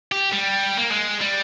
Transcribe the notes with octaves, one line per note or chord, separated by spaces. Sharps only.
G4
G3
A#3
G#3
G3